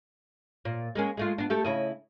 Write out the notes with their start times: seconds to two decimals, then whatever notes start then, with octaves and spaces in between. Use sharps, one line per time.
0.65 A#2
0.95 G#3 A#3 C#4
1.17 G#3 A3 F4
1.38 B3 D4
1.50 A3 G4 A4
1.64 C#3 E4 D#5